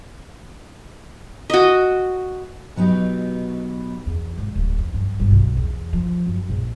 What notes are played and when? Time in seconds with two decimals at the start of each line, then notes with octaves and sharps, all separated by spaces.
1.50 F#4 D#5
2.76 B2 F#3 B3 D#4 G4
4.07 E2
4.38 G#1
4.56 D1
4.79 F2
4.94 G2
5.20 G1
5.31 B1
5.57 E2
5.93 F3
6.26 F#2
6.49 A#1